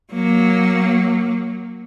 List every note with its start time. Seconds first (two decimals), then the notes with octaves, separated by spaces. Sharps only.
0.13 F#3 A#3